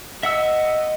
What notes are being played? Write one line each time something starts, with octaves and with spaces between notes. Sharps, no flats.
D#5 E5 F#5 E6